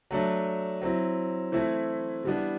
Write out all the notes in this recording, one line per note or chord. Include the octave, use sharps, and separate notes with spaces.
F#3 A3 D4
F#3 C4 E4
E3 A3 C4 E4
E3 G3 B3 D4